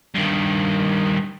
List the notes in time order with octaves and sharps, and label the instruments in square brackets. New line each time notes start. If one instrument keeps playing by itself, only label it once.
[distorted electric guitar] G2 D#3